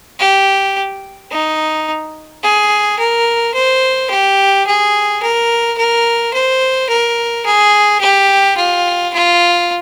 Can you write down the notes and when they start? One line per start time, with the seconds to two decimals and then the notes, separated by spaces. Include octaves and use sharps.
0.20 G4
1.31 D#4
2.43 G#4
2.99 A#4
3.54 C5
4.10 G4
4.67 G#4
5.22 A#4
5.78 A#4
6.34 C5
6.89 A#4
7.46 G#4
8.01 G4
8.57 F4
9.13 F4